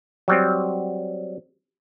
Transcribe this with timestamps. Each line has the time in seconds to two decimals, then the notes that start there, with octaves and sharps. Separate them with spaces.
0.28 F#3 G3 C4